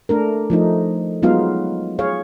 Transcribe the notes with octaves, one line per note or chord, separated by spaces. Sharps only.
A3 D4 A#4
F3 A3 D#4
F#3 G#3 B3 D#4 F4 F5
G#4 C#5 F5